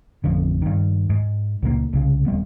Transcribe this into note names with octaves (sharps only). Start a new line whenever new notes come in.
A1 F2 D3
G2 D#3
G#2
C#2 A#2 F#3 A#3
C2 C#3
D#1 G3 B3